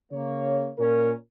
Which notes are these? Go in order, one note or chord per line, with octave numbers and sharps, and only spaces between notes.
C#3 A#3 C#5
A#2 C#4 A#4